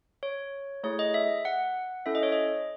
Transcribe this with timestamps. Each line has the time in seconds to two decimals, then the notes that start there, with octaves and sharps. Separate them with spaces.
0.23 C#5
0.83 A3 E4 G#4 C#5
0.99 D#5
1.14 E5
1.45 F#5
2.06 C#4 E4 A4 E5
2.15 D#5
2.23 C#5
2.32 D#5